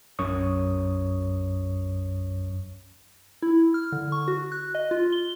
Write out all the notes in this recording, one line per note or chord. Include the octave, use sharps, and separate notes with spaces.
B1 F#2 C#5 C#6 D#6
E4
F6
D3
C#6
F#4
F#6
D#5
F4
G7